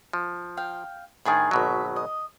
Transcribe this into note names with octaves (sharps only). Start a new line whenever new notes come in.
F3
F5 G5
A2 D#3 D4 G#4 A5
G#1 B2 F#3 E5
D#5